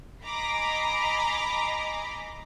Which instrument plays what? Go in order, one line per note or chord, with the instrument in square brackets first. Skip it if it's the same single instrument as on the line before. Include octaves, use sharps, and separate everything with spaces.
[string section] D#5 G#5 A#5 B5 D6 C7